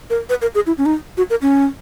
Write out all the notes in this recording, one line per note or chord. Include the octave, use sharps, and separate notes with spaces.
A#4
B4
A#4
G#4
E4
C#4
D#4
F#4
A#4
C#4